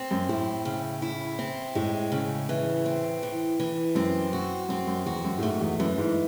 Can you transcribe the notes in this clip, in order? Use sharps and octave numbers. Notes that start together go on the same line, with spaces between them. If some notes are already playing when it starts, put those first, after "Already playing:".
Already playing: C4
F#2
A2 E4
C#3
E4
C4
A2 G#3
C#3
E3
C4
E3
E3
F#2 C4
F#4
F#2 C4
F#2
E2 F#4
F#2
A2
G#2 A3
E2
F#2 E3
G#2